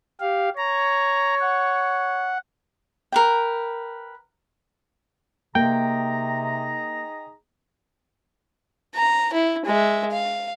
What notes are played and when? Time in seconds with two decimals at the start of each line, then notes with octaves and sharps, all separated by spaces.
0.20 G4 F5
0.57 C#5 A#5
1.41 F#5
3.12 A#4 B4 G5
5.55 C3 A#3 D#4 G#4 G5 A#5
8.95 A#5
9.33 E4
9.66 G#3 E5
10.12 F5